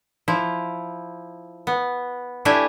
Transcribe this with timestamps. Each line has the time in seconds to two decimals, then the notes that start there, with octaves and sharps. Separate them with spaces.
0.28 F3 E4
1.67 B3
2.45 A3 D4 E4 G4 E5 G#5